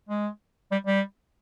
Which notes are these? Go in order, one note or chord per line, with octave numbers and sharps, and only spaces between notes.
G#3
G3
G3